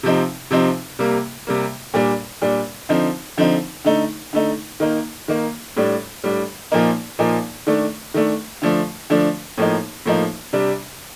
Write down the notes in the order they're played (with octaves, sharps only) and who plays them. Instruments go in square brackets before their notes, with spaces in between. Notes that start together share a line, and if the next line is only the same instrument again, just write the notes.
[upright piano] C3 F3 C4 D#4
C3 F3 C4 D#4
C3 G3 A#3
C3 G3 A#3
A#2 G3 D4
A#2 G3 D4
D3 F3 C4 D#4
D3 F3 C4 D#4
D3 A3 D#4
D3 A3 D#4
D#3 A#3 D#4
D#3 A#3 D#4
A2 G3 D4
A2 G3 D4
A#2 F3 A#3 D#4
A#2 F3 A#3 D#4
D#3 A3 D4
D#3 A3 D4
D3 F3 A3 D4
D3 F3 A3 D4
A2 F3 A#3 D#4
A2 F3 A#3 D#4
C3 G3 D4